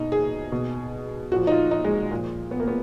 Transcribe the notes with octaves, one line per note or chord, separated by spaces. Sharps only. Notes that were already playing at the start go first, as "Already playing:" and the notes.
Already playing: B2 D#4
G#4
B2
A#2 F3 F#4
D#4
F4
D#4
G#3
A#2 F3
B3
A#3
B3